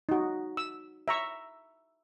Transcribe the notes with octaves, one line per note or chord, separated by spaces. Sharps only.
D#4 F#4
E6
E5 A#5 C#6